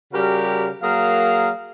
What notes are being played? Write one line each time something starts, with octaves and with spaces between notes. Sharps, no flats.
C#3 G3 F#4 G4 A#4
F#3 A#3 G#4 A#4 F5